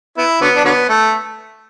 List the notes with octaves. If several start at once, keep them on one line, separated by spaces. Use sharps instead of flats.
B3 E4
D3 F#3 B3
D4
D3 F#3 B3
A3